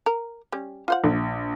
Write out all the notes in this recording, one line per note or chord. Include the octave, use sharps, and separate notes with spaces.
A#4
G3 C#4
F4 C5 F#5
A#1